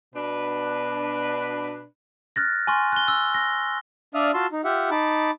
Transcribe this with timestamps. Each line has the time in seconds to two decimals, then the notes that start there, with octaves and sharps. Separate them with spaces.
0.15 B2 D4 B4
2.36 F6 F#6 A6 A#6
2.67 G#5 C6 C#6 F6
2.92 F#6 G7
3.08 E6
3.34 A#6
4.14 D4 D5 E5 F5 D#6 F6
4.34 F4 F#4 A5 C6 E6
4.52 D#4
4.64 F4 G4 E5 F#5
4.91 D#4 A5 B5 D6